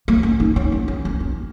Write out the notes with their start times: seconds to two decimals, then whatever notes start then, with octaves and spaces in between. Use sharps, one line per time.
0.08 A#3
0.23 C#4
0.40 D#4
0.56 C#4
0.72 A#3
0.88 C#4
1.05 C#4
1.20 A#3